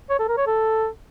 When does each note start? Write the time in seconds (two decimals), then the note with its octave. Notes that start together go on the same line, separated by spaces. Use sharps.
0.10 C#5
0.19 A4
0.28 A#4
0.37 C#5
0.47 A4